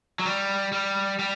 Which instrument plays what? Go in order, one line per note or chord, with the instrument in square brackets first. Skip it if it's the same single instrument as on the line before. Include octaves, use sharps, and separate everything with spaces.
[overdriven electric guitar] F#3
G3
G3
G3